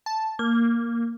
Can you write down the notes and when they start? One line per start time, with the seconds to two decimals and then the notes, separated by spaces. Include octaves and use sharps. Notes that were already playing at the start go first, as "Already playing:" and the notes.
0.06 A5
0.39 A#3